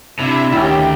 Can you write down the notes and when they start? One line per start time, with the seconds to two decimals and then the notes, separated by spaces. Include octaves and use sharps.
0.19 C3 D4 E4 E5
0.52 D2 D#3 C#4 E4 G4